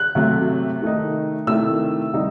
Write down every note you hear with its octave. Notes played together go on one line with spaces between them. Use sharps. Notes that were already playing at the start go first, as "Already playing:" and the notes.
Already playing: F#6
C3 F#3 A3
D#3 A3 D#4
C3 D#3 A3 E4 E6
C3 D#3 G3 D#4